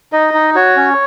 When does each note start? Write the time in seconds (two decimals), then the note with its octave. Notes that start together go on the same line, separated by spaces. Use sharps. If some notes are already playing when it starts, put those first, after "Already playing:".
0.13 D#4 D#5
0.34 D#4
0.55 F#4 C#5
0.76 C#4